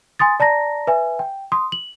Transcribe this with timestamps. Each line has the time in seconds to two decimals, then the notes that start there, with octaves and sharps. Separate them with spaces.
0.19 G#5 C6 D#6 A6
0.40 D5 A5 A#5 A#6
0.87 B4 E5 G#5
1.19 G5
1.52 C6 D#6
1.72 F#7